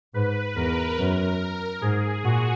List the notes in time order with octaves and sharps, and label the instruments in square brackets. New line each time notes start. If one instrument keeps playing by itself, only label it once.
[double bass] G#2 [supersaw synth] B4
[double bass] E2 [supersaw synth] A#4
[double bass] F#2
[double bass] G#2 [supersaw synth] G#4
[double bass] A#2 [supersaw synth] F#4